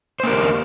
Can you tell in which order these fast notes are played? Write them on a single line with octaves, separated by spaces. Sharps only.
C5 A#3 A#4 G4